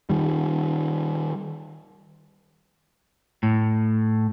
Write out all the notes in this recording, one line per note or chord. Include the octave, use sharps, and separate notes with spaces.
D#3 G3
A2